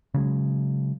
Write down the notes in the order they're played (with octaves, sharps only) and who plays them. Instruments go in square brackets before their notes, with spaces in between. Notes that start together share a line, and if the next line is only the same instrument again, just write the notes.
[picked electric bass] C#3 F#3 G#3